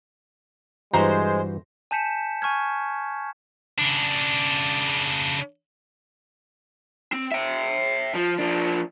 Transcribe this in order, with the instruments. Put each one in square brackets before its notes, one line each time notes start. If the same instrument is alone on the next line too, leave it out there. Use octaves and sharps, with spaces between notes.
[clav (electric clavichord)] G2 E3 F#4 [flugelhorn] G#3 [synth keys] C5 [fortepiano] A#5
[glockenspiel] G#5 A5 G6 B6 C#7 E7
G#5 C#6 F6 G#6
[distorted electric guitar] C#3 D4
[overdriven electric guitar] C4
E5 G5
F3
F3 D4